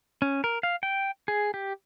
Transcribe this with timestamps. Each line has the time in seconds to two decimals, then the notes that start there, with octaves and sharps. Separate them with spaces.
0.22 C#4
0.44 A#4
0.63 F5
0.83 G5
1.28 G#4
1.54 G4